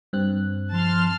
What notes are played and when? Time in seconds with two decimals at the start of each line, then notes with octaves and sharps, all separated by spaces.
0.13 G2 C4 F#6
0.73 F3 A5 C6 F6